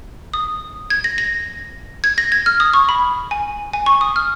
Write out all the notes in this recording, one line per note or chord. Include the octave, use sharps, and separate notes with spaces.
D#6
G#6
A#6
A#6
G#6
A#6
G#6
F6
D#6
C#6
B5
G#5
G#5
C#6
D#6
F6